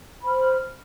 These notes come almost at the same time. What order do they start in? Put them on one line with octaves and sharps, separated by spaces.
B5 C5 F6